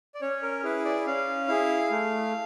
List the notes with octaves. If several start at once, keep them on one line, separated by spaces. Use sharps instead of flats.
D5
C#4 C#5
A#4
E4 G#4 B4
D5
C#4 F5
E4 G#4
A3